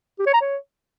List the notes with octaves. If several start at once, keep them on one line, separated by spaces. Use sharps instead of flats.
G4
C#5
A#5
C#5